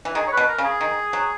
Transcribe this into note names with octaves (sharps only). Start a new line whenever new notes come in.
E3
D#3 G#4
C#5
B4
B2
A#4
C#3
G#4
D#3
F#3